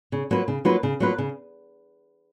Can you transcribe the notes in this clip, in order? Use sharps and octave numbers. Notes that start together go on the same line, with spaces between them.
C#3
F#3 A#3 F4 B4
C#3
F#3 A#3 F4 B4
C#3
F#3 A#3 F4 B4
C#3